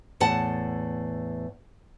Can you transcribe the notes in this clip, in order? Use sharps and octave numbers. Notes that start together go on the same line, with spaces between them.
E2 A2 F#5 A5